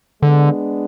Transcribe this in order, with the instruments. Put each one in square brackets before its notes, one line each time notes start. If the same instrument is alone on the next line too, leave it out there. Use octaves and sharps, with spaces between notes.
[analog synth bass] D3 [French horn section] G#3 B3 D4